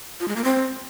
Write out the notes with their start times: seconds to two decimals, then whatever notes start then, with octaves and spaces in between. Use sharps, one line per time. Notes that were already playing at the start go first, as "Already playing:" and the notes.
0.20 F4
0.28 G#3
0.36 A#3
0.44 C4